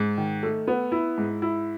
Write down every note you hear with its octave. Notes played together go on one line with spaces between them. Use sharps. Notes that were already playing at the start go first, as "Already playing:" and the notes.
Already playing: G#2
D#3
A3
B3
E4
G#2
E4